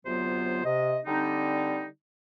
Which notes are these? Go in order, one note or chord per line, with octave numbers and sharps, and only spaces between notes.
D2 C3 F#3 B3 F4 C5
C3 D#5
D3 G3 C4 D#4